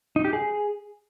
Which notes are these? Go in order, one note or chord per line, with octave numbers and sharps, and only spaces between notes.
D#4
G4
G#4